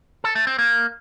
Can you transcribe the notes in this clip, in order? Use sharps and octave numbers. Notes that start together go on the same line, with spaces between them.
A4
A3
C4
A#3